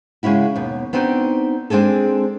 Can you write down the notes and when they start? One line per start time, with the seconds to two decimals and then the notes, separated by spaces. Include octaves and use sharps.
0.23 C#3 G#3 C#4 E4 F#4
0.55 D#2 B2
0.93 B3 C4 D4 D#4 F#4
1.70 G#3 C4 D4 G#4 A4